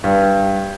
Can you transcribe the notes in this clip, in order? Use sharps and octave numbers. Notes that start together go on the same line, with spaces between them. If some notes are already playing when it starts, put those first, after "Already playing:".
G2